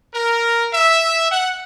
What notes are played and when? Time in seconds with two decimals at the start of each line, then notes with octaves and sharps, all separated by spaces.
0.13 A#4
0.73 E5
1.32 F#5